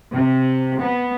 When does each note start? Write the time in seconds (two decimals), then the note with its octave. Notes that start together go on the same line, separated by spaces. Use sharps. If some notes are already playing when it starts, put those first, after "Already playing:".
0.13 C3
0.80 B3